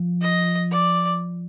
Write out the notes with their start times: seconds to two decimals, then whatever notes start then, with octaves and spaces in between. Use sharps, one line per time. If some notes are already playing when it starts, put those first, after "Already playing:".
Already playing: F3
0.22 D#5
0.72 D5